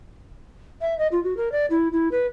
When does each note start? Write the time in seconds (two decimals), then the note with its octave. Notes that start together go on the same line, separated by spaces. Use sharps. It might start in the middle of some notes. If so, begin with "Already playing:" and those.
0.81 E5
0.99 D#5
1.12 F4
1.24 F#4
1.37 A#4
1.52 D5
1.70 E4
1.92 E4
2.11 B4